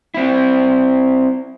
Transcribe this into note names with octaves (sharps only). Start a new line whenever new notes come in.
C4 E4